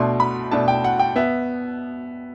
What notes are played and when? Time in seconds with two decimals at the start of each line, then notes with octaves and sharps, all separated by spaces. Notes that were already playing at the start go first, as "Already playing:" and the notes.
Already playing: B2 A3 D4 C6
0.20 B5
0.51 B2 A3 D4 A5
0.68 G5
0.84 F#5
0.99 G5
1.16 B3 E5